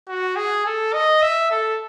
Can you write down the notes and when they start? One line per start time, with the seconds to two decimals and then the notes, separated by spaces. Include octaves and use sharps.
0.08 F#4
0.36 G#4
0.66 A4
0.93 D#5
1.22 E5
1.51 A4